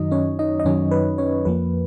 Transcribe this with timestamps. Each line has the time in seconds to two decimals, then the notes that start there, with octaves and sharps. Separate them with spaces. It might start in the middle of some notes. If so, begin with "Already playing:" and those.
Already playing: F#2 D#3 F#3 D#4 D#5
0.11 C#4 C#5
0.39 D#4 D#5
0.60 D#5
0.65 F#2 D#3 F#3 C#4 C#5
0.91 B4
1.18 C#4 C#5
1.45 F2 F3 A#3 B4